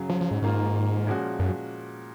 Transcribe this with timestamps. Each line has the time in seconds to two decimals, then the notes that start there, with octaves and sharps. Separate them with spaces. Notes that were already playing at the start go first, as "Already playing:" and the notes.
Already playing: F#2 C#3 F#3
0.09 F3
0.21 F3
0.31 G#2
0.42 G#2 D#3 A#3 F4
1.07 A#2 F3 G#3 C#4 F#4
1.39 F#2